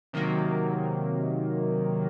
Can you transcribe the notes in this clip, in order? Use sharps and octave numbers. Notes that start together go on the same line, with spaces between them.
C3 D#3 F#3 A#3